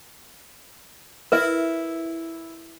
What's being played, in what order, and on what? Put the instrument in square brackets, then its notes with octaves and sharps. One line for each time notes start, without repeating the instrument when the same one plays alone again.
[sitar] E4 [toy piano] A#4 B4 E5